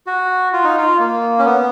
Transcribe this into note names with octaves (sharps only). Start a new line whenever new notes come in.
F#4
F4
D#4
F4
A#3
C#4
B3